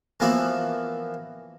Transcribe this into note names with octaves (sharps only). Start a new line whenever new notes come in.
E3 F3 A#3 B3 E4 F#4